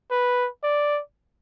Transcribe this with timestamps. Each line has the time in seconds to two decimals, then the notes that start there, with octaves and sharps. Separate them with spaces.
0.11 B4
0.63 D5